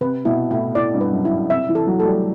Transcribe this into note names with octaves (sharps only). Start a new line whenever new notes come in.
C3 B4
B2 E4
A2 E4
A2 D5
G2
B4
F#2
E4
C3 E5
E3
A4
F#3
A3 A4
G3